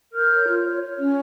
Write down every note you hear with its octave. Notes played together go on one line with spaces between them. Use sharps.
A#4 F6 G6
C#5
F4
C#5
C#5
C#4